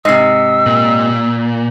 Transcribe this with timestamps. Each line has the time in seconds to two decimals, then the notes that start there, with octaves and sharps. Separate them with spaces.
0.05 G#2 C3 D#5 E6 C7
0.66 A#2